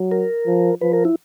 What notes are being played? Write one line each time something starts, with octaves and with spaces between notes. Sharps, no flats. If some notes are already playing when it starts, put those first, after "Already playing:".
Already playing: F#3
A#4
F3
F3 B4
A#4
E4